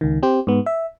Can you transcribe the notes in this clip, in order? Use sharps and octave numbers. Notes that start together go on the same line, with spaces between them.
C#2 D#3
C4 G4 C5
G#2 B3
E5